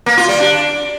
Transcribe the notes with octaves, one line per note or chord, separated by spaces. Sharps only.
A#3
F4
G3
D4